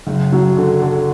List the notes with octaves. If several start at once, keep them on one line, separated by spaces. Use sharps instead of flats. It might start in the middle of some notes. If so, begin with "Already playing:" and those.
F#1
F#3
D3
D3